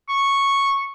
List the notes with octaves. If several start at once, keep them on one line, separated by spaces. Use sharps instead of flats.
C#6